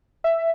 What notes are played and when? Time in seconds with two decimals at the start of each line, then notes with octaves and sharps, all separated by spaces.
0.24 E5